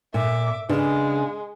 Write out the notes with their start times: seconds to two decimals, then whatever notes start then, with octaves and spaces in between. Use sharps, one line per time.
0.14 A#2 E5 D6
0.69 C#3 G#3 D4 B4